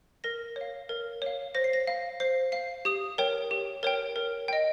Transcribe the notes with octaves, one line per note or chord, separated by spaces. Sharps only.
A#4 A#6
C#5
F5
A#4
C#5 F5
C5 A#6
C7
A#6
F5
C5 C7
F5 C7
G4 D#6
A#4 C#5 G5
G4
A#4 C#5 G5
A#4
D#5 G5